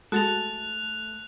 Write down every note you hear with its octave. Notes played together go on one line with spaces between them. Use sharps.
G#3 A3 F#4 A4 F#6 A6 F7